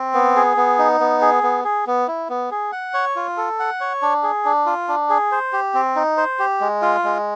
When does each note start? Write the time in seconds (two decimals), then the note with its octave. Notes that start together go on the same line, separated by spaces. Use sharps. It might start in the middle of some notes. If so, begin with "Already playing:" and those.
Already playing: C4
0.14 B3
0.36 G#4
0.57 B3
0.79 D#4
1.00 B3
1.21 G#4
1.43 B3
1.64 G#4
1.87 B3
2.08 E4
2.30 B3
2.51 G#4
2.72 F#5
2.94 C#5
3.16 F4
3.37 A4
3.60 F#5
3.81 C#5
4.02 D4
4.23 G#4
4.45 D4
4.66 F4
4.88 D4
5.10 G#4
5.32 C5
5.53 G4
5.74 C4
5.96 D#4
6.17 C5
6.39 G4
6.61 G#3
6.82 F4
7.04 G#3